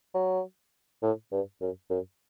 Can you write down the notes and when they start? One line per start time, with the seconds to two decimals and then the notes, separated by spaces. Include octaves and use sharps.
0.14 F#3
1.03 A2
1.32 G2
1.61 F#2
1.90 F#2